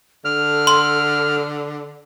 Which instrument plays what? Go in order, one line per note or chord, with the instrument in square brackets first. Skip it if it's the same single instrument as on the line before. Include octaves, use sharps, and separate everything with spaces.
[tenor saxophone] D3 [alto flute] A4 [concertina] F6
[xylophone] C6